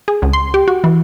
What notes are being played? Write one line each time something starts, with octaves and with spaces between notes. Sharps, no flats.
G#4
C#2
C6
G4
F#4
E3